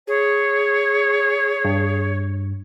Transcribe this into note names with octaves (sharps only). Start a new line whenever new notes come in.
G#4 C#5
G2